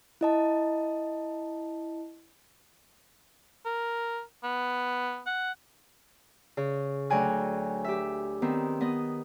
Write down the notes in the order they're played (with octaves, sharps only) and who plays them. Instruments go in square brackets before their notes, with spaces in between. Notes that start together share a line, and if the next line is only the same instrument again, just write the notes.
[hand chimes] E4 D#5 A5
[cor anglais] A#4
B3
F#5
[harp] C#3
D2 F#3 G5 G#5 F#6
G4 E5
D#3 B3 C4
B3 D#5